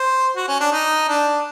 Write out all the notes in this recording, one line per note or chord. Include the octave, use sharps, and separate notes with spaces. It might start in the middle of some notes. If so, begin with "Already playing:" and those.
Already playing: C5
F#4
C#4
D4
D#4
D4